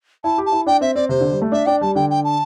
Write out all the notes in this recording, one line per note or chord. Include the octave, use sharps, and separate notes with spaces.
E4 A5
G4
A5
E4
D4 G5
C4 E5
C4 D5
C3 C5
D3
G3
A3
D4 E5
D4 G5
G3 A5
D3 G5
G5
A5